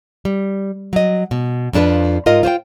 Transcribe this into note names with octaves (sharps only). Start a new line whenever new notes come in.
G3
F#3 D#5
B2
F2 F3 D4 G#4 B4
G#2 F4 A#4 D#5
F4 C5 C#5 G5